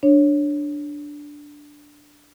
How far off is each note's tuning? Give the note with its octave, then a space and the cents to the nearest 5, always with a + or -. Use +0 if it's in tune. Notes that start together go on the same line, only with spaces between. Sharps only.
D4 +0 C#5 -10